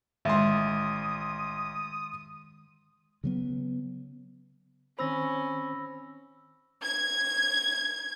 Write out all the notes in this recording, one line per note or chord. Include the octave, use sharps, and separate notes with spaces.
A1 D#3 G#3 E5 C6 D#6
C#3 F#3 B3
D#3 C4 C#4 C5 B5 E6 A#6
G#6